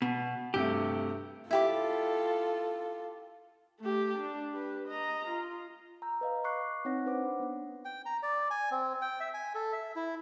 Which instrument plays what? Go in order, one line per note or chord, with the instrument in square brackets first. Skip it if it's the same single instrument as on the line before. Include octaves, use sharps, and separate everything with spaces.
[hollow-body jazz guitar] B2
[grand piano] G2 C3 A3 [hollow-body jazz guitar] G4
[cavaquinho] E4 G4 D6 [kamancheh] F4 A4
[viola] A3 G4
D4
G4 B4
D#5 A#5
F4
[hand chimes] A#5 E6 G6
B4 D#5 F5
B5 C#6 D6 F#6 C7
C4 D#4 C#5 F#5 B5 A#6
D4 B4 C5 F#5 D6
B3 D4
[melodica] G5
A#5
D5
G#5
C4
G5
E5
G#5
A4
E5
E4